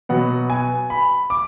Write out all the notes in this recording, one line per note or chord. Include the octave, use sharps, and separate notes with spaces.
B2 F#3 B3 F#5
G#5
B5
D6